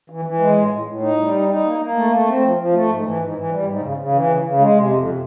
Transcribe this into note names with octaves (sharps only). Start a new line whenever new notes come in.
E3
E3
G#3
A2
A2
A2
D#4
G3
D#4
D#4
A#3
A#3
A3
A3
C4
F3
F3
A3
G#2
E3
G#2
E3
G3
G#2
C#3
C#3
E3
C#3
C#3
G#3
C3
F2
C3